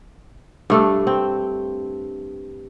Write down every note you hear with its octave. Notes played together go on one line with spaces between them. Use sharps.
G2 A3 D4
C4